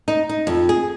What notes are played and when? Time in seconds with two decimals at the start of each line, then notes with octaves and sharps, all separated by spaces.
0.08 D#4
0.29 D#4
0.47 F2
0.69 G#4